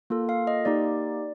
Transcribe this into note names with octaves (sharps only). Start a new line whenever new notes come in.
A#3 F4 A4
F5
D#5
A#3 D#4 G4 D5